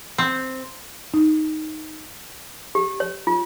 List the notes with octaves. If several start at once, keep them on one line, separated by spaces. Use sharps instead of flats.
C4
D#4
G4
C#5
F4